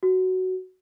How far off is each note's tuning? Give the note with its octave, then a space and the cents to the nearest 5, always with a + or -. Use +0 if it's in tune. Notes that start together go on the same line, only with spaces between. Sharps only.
F#4 +10